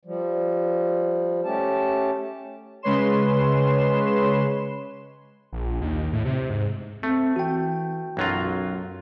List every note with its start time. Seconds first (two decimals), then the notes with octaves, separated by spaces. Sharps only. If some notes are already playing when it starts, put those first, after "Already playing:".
0.05 F3 G3
1.44 A3 C#4 G4 A5
2.82 C#3 G#3 B4 C#5 C6 E7
5.53 A#1
5.81 D#2
6.13 A2
6.25 C3
6.49 G#2
7.03 A3 C4
7.36 E3 F#4 G5
8.17 B1 F#2 F#3 F4